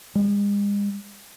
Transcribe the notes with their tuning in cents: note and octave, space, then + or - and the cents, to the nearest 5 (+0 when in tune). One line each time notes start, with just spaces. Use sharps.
G#3 -40